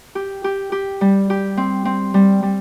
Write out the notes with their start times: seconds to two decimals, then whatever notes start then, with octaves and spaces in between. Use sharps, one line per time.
0.15 G4
0.44 G4
0.72 G4
1.01 G3
1.30 G4
1.57 C4
1.85 C4
2.14 G3
2.43 G3